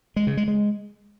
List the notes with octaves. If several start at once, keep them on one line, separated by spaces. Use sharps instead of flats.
G#3
C#3
G#3
G#3